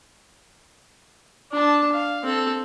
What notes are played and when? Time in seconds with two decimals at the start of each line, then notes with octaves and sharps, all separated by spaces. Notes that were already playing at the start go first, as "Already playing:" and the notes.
1.52 D4 A5
1.92 F5
2.24 C4 A4